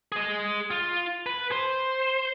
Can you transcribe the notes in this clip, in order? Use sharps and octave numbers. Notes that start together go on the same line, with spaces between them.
G#4 D#5
F4
B4
C5